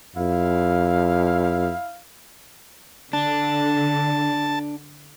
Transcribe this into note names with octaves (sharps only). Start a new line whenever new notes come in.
F2 E4 F5
D3 D4 A5